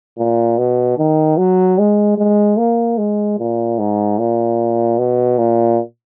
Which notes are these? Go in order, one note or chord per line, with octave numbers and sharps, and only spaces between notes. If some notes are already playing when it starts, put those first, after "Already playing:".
A#2
B2
D#3
F#3
G#3
G#3
A#3
G#3
A#2
G#2
A#2
B2
A#2